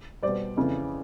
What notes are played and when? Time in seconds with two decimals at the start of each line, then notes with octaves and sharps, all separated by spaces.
0.22 B2 G3 C5 D5
0.57 F2 C#3 E3